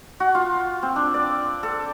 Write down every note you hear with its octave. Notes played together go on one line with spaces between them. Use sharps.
F#4
F4
C4
D4
D5
A4